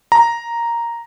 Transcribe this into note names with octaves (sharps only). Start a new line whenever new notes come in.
A#5